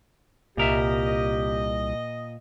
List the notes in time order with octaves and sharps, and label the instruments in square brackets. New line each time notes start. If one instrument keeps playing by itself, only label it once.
[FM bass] C2 [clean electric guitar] A#2 A#4 E5 [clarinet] G4 [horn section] D#5